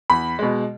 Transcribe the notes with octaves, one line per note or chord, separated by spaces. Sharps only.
E2 B5
B2 G#3